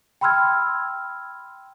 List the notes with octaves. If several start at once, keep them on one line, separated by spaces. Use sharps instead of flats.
G5 B5 C6 E6 F6 G#6